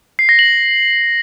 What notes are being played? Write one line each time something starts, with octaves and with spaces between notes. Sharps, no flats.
C7
A#6
F#7